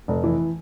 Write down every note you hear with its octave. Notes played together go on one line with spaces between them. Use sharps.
F1
E3